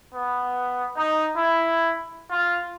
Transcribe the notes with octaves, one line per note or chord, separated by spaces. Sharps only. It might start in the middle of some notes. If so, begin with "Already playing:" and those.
B3
D#4
E4
F4